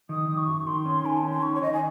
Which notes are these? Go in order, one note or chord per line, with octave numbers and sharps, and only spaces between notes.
D#3 D#6
D#3
C#6
F#2
D#3 C6
C#4
D#3 G#5
A5
C#4
C6
D#3 C#6
C#5
D#3 D#5
G#5